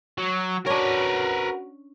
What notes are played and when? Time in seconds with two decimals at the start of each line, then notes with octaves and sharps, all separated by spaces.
0.18 F#3
0.67 C#4 D4 F#4 A#4 B4